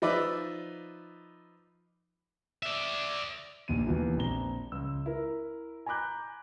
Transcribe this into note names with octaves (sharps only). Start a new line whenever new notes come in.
F3 D#4 B4 D5 E5
D5 E5
A#1 D#2 D#7
D#2 B2 E3
A#1 C4 A#5 G7
C#2 E6
E4 A#4
G#5 A#5 B5 D6 F#6 G6